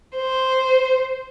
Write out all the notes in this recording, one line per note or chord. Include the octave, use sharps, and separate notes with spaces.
C5